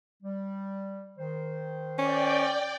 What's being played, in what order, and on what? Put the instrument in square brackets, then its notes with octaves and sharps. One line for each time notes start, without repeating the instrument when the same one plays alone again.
[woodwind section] G3
D#3 C5
[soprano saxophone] C#4 [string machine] D5 G5